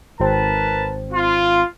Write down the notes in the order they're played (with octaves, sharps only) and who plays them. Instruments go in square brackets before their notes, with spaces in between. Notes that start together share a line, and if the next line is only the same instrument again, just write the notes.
[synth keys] G#1 C4 [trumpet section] A#4 B4 A5
[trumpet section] F4